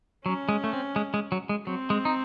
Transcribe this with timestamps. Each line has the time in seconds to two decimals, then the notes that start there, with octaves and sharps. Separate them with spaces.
0.25 F#3 C#4
0.49 G#3
0.64 A3
0.73 C4
0.96 G#3
1.14 G#3
1.32 F#3
1.49 G#3
1.66 F#3 C4
1.90 G#3
2.05 D#4